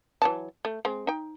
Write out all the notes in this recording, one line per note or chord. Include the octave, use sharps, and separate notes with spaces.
E3 F#3 A5
A3
G#3 C4
D#4 G5